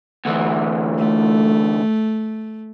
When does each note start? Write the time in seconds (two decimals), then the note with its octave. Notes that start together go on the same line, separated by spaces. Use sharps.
0.25 D2 E3
0.98 A3